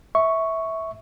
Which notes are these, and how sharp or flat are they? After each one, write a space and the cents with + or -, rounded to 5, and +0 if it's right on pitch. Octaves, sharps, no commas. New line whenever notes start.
E5 -15 C#6 +0